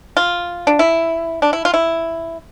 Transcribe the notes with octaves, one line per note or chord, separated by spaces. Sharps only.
F4
D4
E4
D4
E4
F4
E4